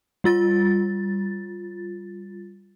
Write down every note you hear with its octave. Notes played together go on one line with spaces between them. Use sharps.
G3 F4 A6